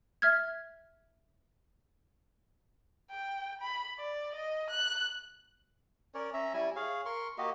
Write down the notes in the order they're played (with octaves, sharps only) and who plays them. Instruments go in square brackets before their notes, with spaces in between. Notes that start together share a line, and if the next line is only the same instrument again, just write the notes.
[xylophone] E5 F6 G#6
[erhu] G5
B5
D5
D#5
F#6
[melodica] C#4 A#4 C#5 D5
C#4 E5 A#5
G3 E4 G#5
G#4 C#5 F5
A#4 C6 C#6
A#3 F#4 G4 D#5